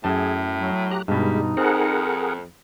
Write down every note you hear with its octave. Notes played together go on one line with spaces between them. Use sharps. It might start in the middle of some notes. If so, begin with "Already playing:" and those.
F#2 A2 G#4 A5
F#3
G4 A#5 F#6
G2 B2 G3 G#3 D#4
F2 C4 G#4 A#4 F#5